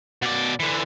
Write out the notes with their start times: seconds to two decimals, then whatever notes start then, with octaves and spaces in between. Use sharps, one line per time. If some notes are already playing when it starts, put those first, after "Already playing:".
0.22 B2 D5
0.60 D3 E3